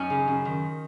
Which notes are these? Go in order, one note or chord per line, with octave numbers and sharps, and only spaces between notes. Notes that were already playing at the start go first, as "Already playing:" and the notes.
Already playing: F#2 C#4 D#4 F#4
C#3
F#2
D#3